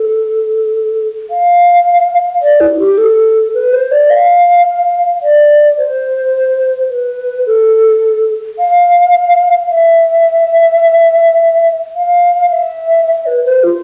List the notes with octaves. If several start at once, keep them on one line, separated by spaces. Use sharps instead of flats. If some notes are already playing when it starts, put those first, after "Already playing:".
Already playing: A4
F5
D5
E4
G4
A4
B4
C5
D5
F5
D5
C5
B4
A4
F5
E5
F5
E5
E5
B4
C5
F4